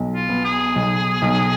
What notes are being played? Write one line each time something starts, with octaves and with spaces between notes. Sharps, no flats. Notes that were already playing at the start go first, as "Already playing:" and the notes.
Already playing: B1
F4
B3
G#4
B1
B1